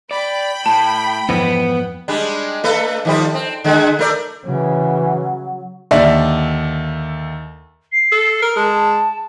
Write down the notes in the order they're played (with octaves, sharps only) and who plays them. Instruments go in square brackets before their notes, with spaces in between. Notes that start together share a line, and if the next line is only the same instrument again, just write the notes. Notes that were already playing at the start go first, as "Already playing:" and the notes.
[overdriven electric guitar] D5 [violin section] G5 B5
[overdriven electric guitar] A2 [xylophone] A5
[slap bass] F2 G#2 E3 [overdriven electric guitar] B3
[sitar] G3 G#3 D4
A3 A4 B4
D#3 F3 G3
C4
D3 G#3 A3
A3 A#4 D5
[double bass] C#3 [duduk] E3 [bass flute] F#3
[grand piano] D#2 D3 D5 E5
[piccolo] C7
[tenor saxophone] A4
[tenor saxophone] A#4 [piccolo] A#5
[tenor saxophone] G#3 [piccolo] A5